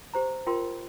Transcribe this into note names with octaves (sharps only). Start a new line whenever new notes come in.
G4 C5 A#5
F4 A#4 G5 C6